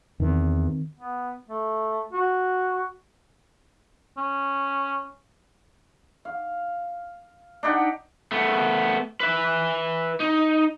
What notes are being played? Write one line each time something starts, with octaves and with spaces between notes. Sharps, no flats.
E2 D#3 C4
B3
A3
F#4
C#4
F5
D4 D#4 G4 F#5
A3 B3
B4 E5
D#4